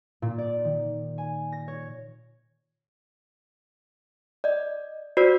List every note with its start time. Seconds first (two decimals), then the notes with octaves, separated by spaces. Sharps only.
0.22 A#2
0.38 D5
0.65 D#3
1.18 G#5
1.52 A#6
1.68 C#5
4.44 D5 D#5
5.17 F#4 C5 D5 E6 B6